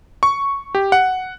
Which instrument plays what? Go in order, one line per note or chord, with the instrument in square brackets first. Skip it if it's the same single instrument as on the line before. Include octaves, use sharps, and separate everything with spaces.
[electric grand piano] C#6
G4
F#5